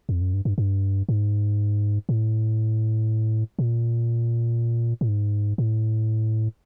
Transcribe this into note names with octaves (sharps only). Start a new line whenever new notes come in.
F2
F#2
G2
G2
G2
G#2
A2
A#2
A2
G#2
A2